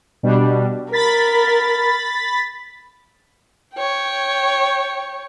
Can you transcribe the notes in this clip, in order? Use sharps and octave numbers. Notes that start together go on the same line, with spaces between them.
B2 G3 D4
A#4 B5 A6 B6
C#5 G5